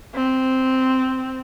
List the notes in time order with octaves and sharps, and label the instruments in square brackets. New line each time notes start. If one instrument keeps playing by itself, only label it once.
[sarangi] C4